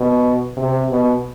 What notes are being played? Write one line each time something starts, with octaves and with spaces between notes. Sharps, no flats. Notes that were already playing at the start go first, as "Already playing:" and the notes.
Already playing: B2
C3
B2